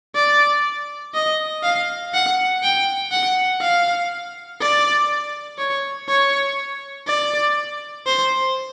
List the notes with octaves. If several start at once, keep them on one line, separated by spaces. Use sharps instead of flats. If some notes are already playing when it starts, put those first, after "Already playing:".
D5
D#5
F5
F#5
G5
F#5
F5
D5
C#5
C#5
D5
C5